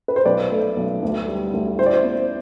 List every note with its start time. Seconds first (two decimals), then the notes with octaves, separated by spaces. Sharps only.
0.08 B4
0.16 C5
0.25 B1 B4 D5
0.51 A3
0.76 B1
1.03 D2
1.28 G3
1.54 D2
1.78 E4 C5
1.86 D5
1.93 C5
2.04 B3